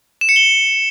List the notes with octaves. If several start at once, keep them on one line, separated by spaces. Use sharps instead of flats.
E7
C#7
G7